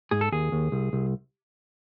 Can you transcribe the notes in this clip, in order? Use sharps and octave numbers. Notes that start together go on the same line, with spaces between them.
G#2 G#4
A4
D#2 G#4
D#2
C2
C2